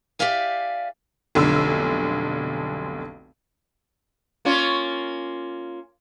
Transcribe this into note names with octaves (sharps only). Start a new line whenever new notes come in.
G4 G#4 D5 E5 F5 G#5
F1 B1 D3 E6
A#3 C#4 F4